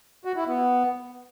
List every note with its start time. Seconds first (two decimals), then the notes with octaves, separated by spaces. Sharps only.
0.25 F#4
0.36 E4
0.47 B3